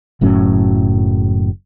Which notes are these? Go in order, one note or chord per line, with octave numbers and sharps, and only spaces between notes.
F#1 A2 F#3 C#4